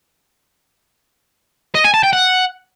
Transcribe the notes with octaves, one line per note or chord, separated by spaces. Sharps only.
D#5
G#5
A5
G5
F#5